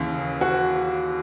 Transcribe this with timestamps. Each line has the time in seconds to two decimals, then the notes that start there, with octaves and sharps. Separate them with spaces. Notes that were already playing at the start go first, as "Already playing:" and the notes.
Already playing: D#2 C#3 E3
0.41 F#4